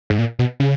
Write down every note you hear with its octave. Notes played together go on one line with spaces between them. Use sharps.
G#2
A#2
B2
C#3